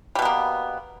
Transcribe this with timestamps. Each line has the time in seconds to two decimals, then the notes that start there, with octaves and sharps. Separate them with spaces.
0.15 G3
0.19 B2
0.22 B3
0.25 A#3